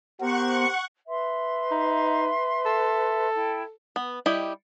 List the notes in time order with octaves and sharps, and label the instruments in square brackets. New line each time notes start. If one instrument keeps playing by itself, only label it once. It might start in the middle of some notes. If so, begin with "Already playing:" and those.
[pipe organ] B3 [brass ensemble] G4 A#4 C5 [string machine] F#5 C#6
[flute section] B4 E5 C6
[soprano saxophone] D#4
A4
[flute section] E4 G5
[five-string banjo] B3
G3 E4 G4 D#5 G5